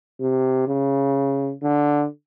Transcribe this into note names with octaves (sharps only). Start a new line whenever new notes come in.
C3
C#3
D3